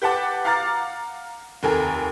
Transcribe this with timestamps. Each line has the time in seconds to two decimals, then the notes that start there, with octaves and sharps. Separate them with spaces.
0.02 G4 B4 F#5 A5 D6
0.45 F5 F#5 A#5 D6 F6 A6
1.63 F1 D#2 A4 A#4 G#5